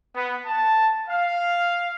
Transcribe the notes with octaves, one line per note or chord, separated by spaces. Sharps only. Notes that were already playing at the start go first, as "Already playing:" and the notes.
B3
A5
F5